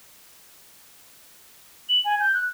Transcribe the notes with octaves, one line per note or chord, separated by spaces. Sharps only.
F#7
G#5
G6
F#6